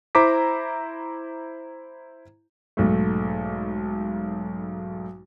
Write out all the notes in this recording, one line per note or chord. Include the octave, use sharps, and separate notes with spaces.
E4 C5 A#5 D6 B6
B1 G#2 A3